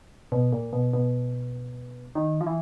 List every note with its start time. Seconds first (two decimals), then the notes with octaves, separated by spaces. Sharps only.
0.32 B2
0.52 A#2
0.73 B2
0.93 B2
2.15 D#3
2.41 F3
2.46 E3